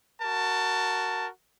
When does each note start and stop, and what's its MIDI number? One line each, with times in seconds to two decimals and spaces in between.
0.22 1.27 66
0.22 1.27 70
0.22 1.27 81